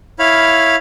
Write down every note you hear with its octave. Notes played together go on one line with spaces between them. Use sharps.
E4 C#5 F5 B5 F6